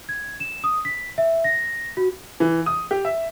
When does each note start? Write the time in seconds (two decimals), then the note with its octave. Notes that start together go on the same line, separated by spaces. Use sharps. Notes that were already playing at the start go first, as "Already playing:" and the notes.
0.09 G#6
0.40 E7
0.64 D#6
0.85 B6
1.18 E5
1.44 A#6
1.97 F#4
2.40 E3
2.66 D#6
2.91 G4
3.05 E5